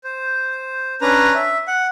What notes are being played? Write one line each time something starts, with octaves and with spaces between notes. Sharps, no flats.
C5
C#4 D4 B4 A#5
E5
F#5